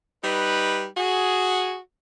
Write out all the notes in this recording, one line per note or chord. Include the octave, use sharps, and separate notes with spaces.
G3 D#4 B4
F#4 G#4